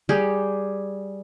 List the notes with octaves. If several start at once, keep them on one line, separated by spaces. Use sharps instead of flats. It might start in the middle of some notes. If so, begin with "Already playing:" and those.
G3 G4 G#4